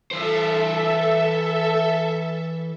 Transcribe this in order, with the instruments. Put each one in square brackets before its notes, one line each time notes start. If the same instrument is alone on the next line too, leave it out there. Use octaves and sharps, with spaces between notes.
[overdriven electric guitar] E3 C5 [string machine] A4 E5